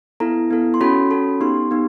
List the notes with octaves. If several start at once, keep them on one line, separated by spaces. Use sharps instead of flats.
B3 E4 A4 A#5
B3 E4 A4
C6
C#4 F#4 A4 B5
C#4 F#4 A4
B3 D#4 G4 C6
B3 D#4 G4